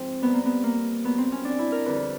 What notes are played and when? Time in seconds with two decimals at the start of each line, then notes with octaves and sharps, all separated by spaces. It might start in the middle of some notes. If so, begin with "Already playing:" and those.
Already playing: G#2 F3 C4
0.22 A#2 G3 B3
0.34 A#3
0.46 B3
0.64 A#3
1.04 A#2 F#3 B3
1.18 C4
1.32 C#4
1.45 D4
1.59 E4
1.72 A#4
1.86 F2 D3 G3 B4